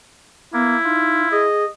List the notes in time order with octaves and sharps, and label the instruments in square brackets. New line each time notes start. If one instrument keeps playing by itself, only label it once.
[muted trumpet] A#3 [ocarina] B3 [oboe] E4
[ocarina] D#4 [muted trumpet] F4
[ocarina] G#4 [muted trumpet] D#5